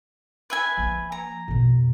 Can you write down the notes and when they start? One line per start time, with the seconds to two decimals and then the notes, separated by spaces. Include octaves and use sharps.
0.50 B4 E5 G#5
0.77 F3 A#3
1.12 A#5
1.48 F2 B2